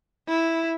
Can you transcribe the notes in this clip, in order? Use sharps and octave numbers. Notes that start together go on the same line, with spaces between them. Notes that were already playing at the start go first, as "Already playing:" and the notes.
E4